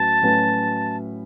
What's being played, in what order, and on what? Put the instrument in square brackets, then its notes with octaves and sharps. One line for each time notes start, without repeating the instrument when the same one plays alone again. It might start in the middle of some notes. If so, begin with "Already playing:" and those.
Already playing: [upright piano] A2 F#3 C#4 F#4 B4 [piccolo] A5
[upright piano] A2 F#3 C#4 F#4 B4